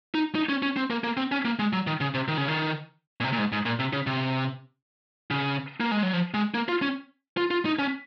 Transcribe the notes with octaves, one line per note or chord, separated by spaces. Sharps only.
D#4
D#4
C#4
C#4
C4
A#3
A#3
C4
C#4
A#3
G#3
F#3
D#3
C#3
C3
D#3
C#3
D#3
A#2
C3
A#2
G#2
G#2
A#2
C3
C#3
C3
C#3
A#3
G#3
F#3
F3
G#3
A#3
F4
C#4
F4
F4
D#4
C#4